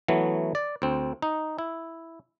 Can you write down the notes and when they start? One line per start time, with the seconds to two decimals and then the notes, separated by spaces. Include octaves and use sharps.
0.08 E3 F#3 A3 B3
0.55 D5
0.82 D2 C4
1.22 D#4
1.59 E4